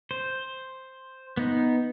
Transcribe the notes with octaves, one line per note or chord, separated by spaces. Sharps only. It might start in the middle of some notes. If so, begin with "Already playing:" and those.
C5
B3 D#4